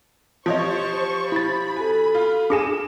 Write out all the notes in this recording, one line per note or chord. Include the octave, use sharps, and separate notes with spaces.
F3 C4 F4 G4 C5 C#5 D#5 C#6
E4 B5 A6
F#4 A4 G#5
F4
D4 G#4 G#5 D6 E7